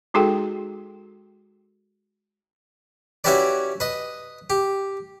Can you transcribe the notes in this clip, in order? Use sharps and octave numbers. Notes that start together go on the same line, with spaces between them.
G#3 D#4 F#4 G#4 A4 G5
C#4 E4 F#4 G4 B4 D5
B4 D#5
G4